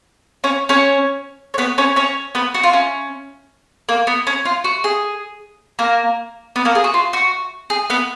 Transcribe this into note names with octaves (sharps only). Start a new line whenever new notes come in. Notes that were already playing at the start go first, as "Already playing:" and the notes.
C#4 C#5
C#4 C#5
C#5
B3 B4
C#4 C#5
C#4 C#5
B3 B4
F#4
F4
C#4
A#3
B3
C#4
F4
F#4
G#4
A#3 A#4
B3 B4
A#3 A#4
G#4
F#4
F4
F#4
G#4
B3 B4